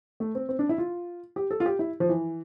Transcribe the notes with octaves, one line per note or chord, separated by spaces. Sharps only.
A3
C4
C4
D4
E4
F4
G4
A4
F4
G4
E4
F3
E3